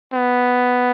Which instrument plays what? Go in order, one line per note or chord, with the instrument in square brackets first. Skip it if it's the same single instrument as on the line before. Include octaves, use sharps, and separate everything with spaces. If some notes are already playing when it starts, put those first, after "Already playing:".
[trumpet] B3